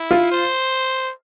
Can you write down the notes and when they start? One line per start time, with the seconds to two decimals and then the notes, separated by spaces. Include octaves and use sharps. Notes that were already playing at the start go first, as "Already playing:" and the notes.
Already playing: E4
0.11 F4
0.32 C5